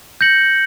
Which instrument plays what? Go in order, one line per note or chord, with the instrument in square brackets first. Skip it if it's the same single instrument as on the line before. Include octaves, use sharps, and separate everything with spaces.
[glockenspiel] G6 A#6 C#7 F#7